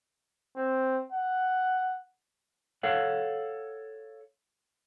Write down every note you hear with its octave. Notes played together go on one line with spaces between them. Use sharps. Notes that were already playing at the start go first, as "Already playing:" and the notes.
C4
F#5
A4 C#5 F5 F#5